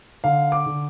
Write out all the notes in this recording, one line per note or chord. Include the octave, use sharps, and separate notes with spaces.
D3 F5
D6
D3